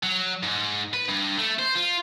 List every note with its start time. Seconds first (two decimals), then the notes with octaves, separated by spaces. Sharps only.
0.03 F#3
0.43 G#2
0.94 B4
1.09 G2
1.38 A3
1.59 C5
1.75 F4